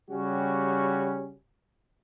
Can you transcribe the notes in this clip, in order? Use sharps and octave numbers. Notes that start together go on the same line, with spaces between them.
C#3 G3 C#4 F#4 G4